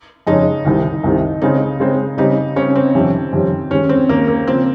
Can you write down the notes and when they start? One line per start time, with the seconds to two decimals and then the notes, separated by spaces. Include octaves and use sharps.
0.27 F2 C#3 G#3 C#4 D#4
0.65 C2 C3 D#3
1.04 C2 C3 D#3
1.42 C#3 G#3 C4 D#4
1.80 C#3 G#3 C4
2.17 C#3 G3 C4 D#4 G4
2.56 C#3 G3 C4 C#4 G4
2.75 C4
2.94 F2 C3 D#3 G3 C#4
3.33 F2 C3 D#3 G3 C#4
3.71 D#2 D#3 G#3 C#4
3.89 C4
4.09 D#2 D#3 G#3 A#3
4.28 A#3
4.47 C#3 F3 A#3 C4 F4